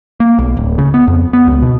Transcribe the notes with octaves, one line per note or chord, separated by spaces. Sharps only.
A#3
B1
D1
C#3
B3
F2
B3
C#2
B2